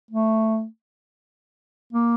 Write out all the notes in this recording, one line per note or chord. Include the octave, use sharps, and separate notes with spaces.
A3
A#3